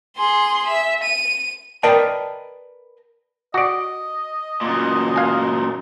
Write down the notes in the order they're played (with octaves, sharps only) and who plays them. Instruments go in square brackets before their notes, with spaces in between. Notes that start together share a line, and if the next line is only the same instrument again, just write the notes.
[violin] G#4 C6
E5
D#7
[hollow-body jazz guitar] A#4 B4 D5 D#5 G5 A5
[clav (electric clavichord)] F#4 D5 [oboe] D#5
[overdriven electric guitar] F#2 A#2
[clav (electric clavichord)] F5 G#5